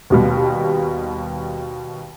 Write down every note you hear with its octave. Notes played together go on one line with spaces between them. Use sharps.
D#2 B2 G3